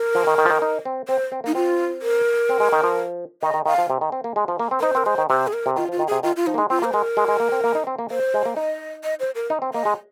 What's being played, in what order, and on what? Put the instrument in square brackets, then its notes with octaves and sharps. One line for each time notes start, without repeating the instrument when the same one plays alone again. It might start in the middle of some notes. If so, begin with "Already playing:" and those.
Already playing: [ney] A#4
[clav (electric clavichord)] F3
D#3
D#3
F3
D#3
D#4
C4
[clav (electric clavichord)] C4 [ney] C5
[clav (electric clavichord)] C4
[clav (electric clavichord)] A#3 [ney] D#4
[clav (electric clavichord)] C4 [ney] F4
[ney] A#4
[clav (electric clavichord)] C4
G#3
D#3
F3
[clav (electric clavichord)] D#3 [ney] D#5
[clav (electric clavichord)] D#3
[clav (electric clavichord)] D#3 [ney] F5
[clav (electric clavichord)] F3
C3
D#3
C4
A#3
G#3
F3
A#3
C4
[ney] A#4
[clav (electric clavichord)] D#4 [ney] C5
[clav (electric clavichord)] C4 [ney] A#4
[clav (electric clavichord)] G#3 [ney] C5
[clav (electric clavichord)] D#3
[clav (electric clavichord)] C3 [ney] C5
[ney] G#4
A#4
[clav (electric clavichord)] C3
[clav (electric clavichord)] D#3 [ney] F4
[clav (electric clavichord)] F3
[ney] F4
[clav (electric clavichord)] D#3
[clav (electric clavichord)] C3 [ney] G#4
[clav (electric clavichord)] D#3 [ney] F4
[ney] F4
[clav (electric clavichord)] F3 [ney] D#4
[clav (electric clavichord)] A#3
G#3
[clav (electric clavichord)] C4 [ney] F4
[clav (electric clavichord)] A#3 [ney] C5
[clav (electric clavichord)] G#3 [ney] A#4
[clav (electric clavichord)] G#3
G#3
A#3
C4
A#3
D#4
C4
A#3
[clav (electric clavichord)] A#3 [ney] C5
[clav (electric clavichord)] G#3
A#3
[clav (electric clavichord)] D#4 [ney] D#5
[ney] D#5
C5
A#4
[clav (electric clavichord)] D#4
C4
[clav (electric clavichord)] A#3 [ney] D#5
[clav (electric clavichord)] G#3